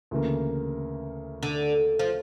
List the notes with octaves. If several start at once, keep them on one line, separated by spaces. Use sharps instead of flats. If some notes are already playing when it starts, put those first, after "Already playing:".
D2 C#3 E3 A#3
D3
F3